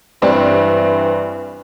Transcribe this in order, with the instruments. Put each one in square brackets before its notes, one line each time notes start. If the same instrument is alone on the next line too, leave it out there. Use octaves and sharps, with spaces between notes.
[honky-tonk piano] G2 C4 D4 [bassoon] E3